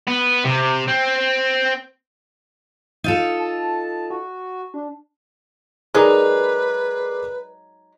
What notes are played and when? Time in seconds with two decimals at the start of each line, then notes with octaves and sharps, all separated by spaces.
0.07 B3
0.44 C3
0.88 C4
3.04 D#4 F4 A4
3.39 A5
4.11 F#4
4.74 D4
5.94 F#3 G#3 D#4 G#4 A#4 B4 D5